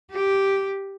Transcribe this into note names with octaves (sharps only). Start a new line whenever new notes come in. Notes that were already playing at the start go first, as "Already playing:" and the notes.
G4